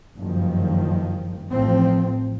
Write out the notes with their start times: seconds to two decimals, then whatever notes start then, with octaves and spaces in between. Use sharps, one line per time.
0.18 F#1 G2 D#3 F3
1.52 A1 F3 C4